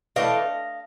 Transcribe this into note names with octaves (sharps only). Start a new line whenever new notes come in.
E3 A3 D4 D#5 F5